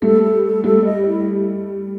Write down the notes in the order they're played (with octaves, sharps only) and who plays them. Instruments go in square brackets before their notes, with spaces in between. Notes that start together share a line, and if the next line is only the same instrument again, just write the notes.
[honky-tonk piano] G3 A3 [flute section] A4
[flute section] A4
A4
[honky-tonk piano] G3 A3 [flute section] A4
[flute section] D#5
E4